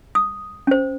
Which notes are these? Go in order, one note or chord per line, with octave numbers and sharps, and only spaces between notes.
D#6
C#4 C5